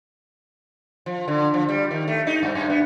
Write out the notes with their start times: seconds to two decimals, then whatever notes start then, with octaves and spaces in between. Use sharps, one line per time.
1.06 F3
1.28 D3
1.54 F3
1.69 G3
1.91 D#3
2.08 A3
2.27 D#4
2.43 G2
2.55 F#2
2.70 B3